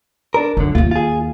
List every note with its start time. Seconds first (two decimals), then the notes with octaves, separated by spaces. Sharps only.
0.34 D4 A#4
0.57 F#2 D3 F4
0.75 D#2 D#3 F4
0.91 F4 G#4